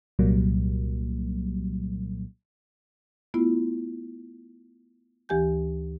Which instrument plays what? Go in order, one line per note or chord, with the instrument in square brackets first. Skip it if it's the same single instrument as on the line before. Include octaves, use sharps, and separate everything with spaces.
[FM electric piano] C2 A#2 F#3 G3 A#3
[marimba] A3 B3 E4 F4
D2 E3 G4 G#5 G6